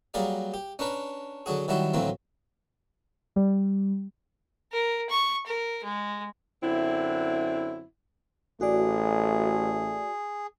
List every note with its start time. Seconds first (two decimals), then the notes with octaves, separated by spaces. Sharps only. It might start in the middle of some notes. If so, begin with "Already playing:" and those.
0.14 F#3 G3 A#3 G#4 A#4 D5
0.54 G4
0.79 C#4 D4 A#4 B4
1.46 D3 F#3 F#4 G#4
1.68 D#3 F#3 G3 E4 F#4
1.94 D2 A2 E3 F#3 A#3 C4
3.36 G3
4.72 A#4
5.10 C#6
5.47 A#4
5.84 G#3
6.62 F#2 D3 C4 E4
8.61 A1 A3 F#4 G#4 D5